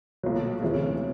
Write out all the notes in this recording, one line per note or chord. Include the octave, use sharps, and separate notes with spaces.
B1 A#2 F#3
D2 C3 E3 G#3 C#4